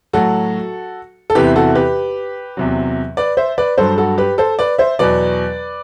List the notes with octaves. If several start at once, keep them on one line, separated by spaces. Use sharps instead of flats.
A2 F#3 F#4 A4
A4
E2 C3 E3 G4 B4
F#4 A4
G4 B4
E2 C3 F#3
B4 D5
C5 E5
B4 D5
G2 F#3 A4 C5
F#4 A4
G4 B4
A4 C5
B4 D5
C5 E5
E2 B2 F#3 B4 D5